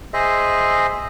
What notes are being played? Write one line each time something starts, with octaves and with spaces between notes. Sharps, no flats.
G#4 C5 D#5 E5